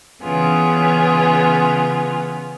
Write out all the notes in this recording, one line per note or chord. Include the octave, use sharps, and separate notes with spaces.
C#3 E3 B3 F4 G#4